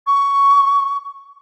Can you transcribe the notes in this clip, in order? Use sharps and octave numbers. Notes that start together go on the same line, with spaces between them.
C#6